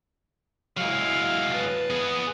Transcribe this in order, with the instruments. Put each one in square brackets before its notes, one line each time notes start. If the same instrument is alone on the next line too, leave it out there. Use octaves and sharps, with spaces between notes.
[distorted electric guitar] F#3 G#3 [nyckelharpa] E4 F5
[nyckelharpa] B4 A5
[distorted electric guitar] B3 G#4